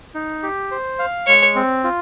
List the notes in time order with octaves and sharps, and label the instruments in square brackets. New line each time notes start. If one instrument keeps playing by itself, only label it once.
[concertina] D#4
G4
C5
F5
[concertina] G#3 [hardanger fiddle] C#5
[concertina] C4
F4